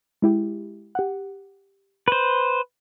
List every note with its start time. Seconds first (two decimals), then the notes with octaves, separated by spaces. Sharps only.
0.22 G#3 E4 G4
0.95 G4 F#5
2.08 B4 C5